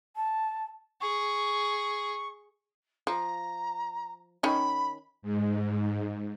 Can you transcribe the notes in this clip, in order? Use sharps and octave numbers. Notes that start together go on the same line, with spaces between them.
A5
G#4 C#6
F3 A#5
D#3 C#4 D#4 B5
G#2